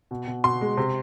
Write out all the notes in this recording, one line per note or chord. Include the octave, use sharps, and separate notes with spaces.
B2
B2
B2 C6
G#3
C3